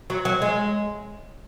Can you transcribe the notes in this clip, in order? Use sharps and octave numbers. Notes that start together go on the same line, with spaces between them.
F#3
F#3
G#3